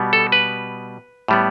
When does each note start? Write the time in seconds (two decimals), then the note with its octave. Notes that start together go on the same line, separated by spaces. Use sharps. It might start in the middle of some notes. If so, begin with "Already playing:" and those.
Already playing: B2 G3 B3
0.13 A4
0.32 B4
1.28 A2 G3 B3